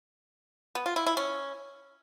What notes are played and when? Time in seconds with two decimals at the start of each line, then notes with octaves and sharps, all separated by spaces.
0.75 B3
0.86 F4
0.96 E4
1.06 E4
1.17 C#4